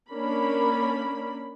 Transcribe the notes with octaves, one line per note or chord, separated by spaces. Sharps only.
A#3 C#4 D4 A#4 B5